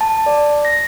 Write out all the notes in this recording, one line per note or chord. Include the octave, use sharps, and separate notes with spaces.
A5
D5
A#6